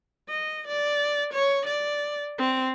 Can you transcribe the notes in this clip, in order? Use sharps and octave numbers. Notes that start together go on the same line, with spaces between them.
D#5
D5
C#5
D5
C4